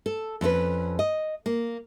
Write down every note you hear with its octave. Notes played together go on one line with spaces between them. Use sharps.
A4
F2 C#4 E4 B4
D#5
A#3